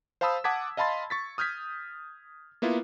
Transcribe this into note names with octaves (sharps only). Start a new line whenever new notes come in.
C5 F5 A5 B5 D#6 E6
F#5 A5 D6 D#6 G#6 B6
D#5 F5 A5 B5 C6 A6
C#6 A6 B6
D#6 F6 G6 G#6 B6
A#3 B3 E4 F4